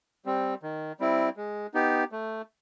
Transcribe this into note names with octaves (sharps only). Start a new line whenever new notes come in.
G3 C4
D#3
G3 C4 E4
G#3
B3 D#4 G4
A3